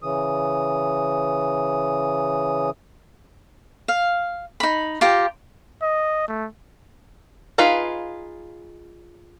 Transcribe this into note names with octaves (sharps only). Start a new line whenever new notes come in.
C#3 E3 D#6
F5
D#4 B5
F4 G4 G5 A#5
D#5
A3
D#4 F4 G#4 B4 F5